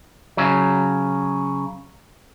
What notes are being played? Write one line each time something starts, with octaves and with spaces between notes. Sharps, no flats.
C#3 F#3